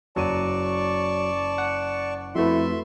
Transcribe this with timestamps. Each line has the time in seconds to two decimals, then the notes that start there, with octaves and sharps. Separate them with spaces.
0.16 F#1 F#3 D5 A5 C#6 D#7
1.58 F#5
2.35 F2 A3 E4 F#4 B4 E5 C6